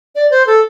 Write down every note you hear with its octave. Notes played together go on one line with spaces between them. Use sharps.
D5
C5
A4